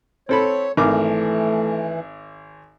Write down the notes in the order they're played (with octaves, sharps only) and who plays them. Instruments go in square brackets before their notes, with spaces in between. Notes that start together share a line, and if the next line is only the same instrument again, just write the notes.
[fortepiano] C4 A4 B5 [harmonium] C#5
[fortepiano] G#1 A#4 D6 [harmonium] E3 [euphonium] A3